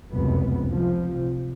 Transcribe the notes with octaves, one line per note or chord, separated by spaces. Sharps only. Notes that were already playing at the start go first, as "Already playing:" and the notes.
F1 C#2 F#2 C#3 B3
C3 F3